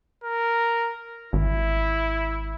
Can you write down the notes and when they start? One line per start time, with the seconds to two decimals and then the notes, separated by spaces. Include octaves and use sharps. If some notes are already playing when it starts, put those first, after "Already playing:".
0.24 A#4
1.33 G#1 E4